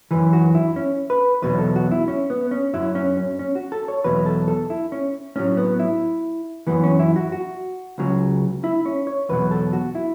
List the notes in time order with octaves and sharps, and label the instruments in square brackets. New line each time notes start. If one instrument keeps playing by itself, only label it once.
[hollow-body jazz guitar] F#2 E3 B4
F#4
E4
C#4
B4
E2 B2 F#3 B4
A4
F#4
E4
C#4
B3
C#4
F#2 F#3 E4
C#4
C#4
C#4
F#4
A4
C#5
E2 B2 F#3 B4
A4
A4
E4
C#4
A2 F#3 C#4
B3
E4
F#2 E3 B3
C#4
E4
F#4
F#4
C#2 C#3 F#3
E4
C#4
C#5
E2 B2 F#3 B4
A4
F#4
E4